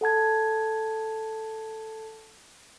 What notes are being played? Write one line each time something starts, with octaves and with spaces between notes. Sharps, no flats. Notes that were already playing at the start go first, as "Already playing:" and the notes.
A4 F#5 A5 G#6